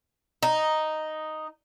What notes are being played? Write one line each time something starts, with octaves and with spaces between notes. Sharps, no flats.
D#4